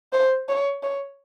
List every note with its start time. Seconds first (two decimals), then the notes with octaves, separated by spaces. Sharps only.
0.13 C5
0.49 C#5
0.83 C#5